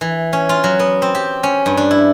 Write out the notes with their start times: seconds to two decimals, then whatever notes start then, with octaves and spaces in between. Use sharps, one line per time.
0.01 E3
0.33 C#4
0.49 F4
0.64 F#3
0.79 B3
1.02 C4
1.15 G4
1.43 C#4
1.66 G2
1.77 D4
1.91 E4